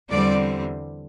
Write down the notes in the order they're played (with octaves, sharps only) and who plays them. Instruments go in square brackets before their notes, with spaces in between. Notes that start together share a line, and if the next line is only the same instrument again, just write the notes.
[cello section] E2 D3 G3 C4 D5